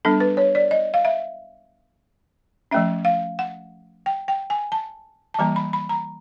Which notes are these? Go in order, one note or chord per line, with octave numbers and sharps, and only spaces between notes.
G3 B3 D4 A4
B4
C#5
D5
D#5
F5
E5
F3 A3 C#4 E5
F5
F#5
G5
G5
G#5
A5
A5
E3 G3 A#3 A#5
B5
B5
A#5